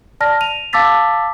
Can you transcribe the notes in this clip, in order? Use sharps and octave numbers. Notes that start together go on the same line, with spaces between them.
D5 A5 F6 A#6
D#7 F7
F5 A5 D6 E6 A6 B6